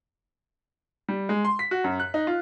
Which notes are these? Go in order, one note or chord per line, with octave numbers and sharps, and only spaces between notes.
G3
G#3
C6
B6
F#4
F#2
F#6
D#4
F4